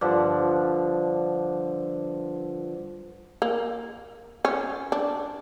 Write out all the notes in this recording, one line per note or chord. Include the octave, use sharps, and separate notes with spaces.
G2 D3 F3
A#3
C#4
D4